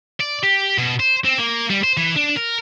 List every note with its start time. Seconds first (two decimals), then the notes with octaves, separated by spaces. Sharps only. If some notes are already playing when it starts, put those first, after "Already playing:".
0.20 D5
0.43 G4
0.78 B2
1.00 C5
1.25 C4
1.38 A#3
1.70 G3
1.84 C5
1.97 E3
2.16 D4
2.36 A#4